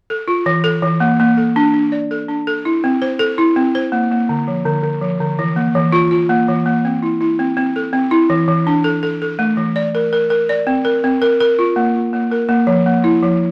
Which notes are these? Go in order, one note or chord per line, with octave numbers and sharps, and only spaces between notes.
A4
F4
E3
A4
E3
A#3
A#3
A4
D4
D4
D5
A4
D4
A4
E4
C4
C5
A4
E4
C4
C5
A#3
A#3
D3
F3
D3
D3
F3
D3
E3
A#3
E3
F4
F4
A#3
E3
A#3
C4
E4
E4
C4
C4
A4
C4
E4
E3
E3
D4
A4
A4
A4
A3
E3
D5
A#4
A#4
A#4
D5
C4
A#4
C4
A#4
A#4
F4
A#3
F4
A#3
A#4
A#3
F3
A#3
E4
F3